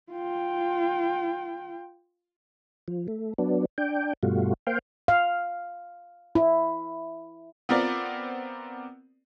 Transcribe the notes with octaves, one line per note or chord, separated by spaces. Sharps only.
F4 G5
F3
A3
F#3 B3 D4
D4 G5
G2 B2 G3 A3 F4 F#4
A#3 C5 F5 G5
F5
E4
B3 C4 F4 A#4 D5